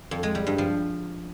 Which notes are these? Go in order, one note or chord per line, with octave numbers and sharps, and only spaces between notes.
F2
G#3
G3
G2
F3